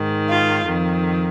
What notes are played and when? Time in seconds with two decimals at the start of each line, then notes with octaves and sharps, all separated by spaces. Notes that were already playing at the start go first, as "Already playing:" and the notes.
Already playing: G#2 D#3
0.28 F4
0.65 F2 D#3